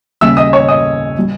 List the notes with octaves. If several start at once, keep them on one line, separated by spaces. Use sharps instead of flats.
D#2 C#3 G3 E5 E6
D#5 D#6
C#5 C#6
D#5 D#6
G3